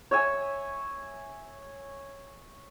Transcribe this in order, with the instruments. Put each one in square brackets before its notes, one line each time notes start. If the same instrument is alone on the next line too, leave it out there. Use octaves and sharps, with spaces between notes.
[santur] C#5 E5 G#5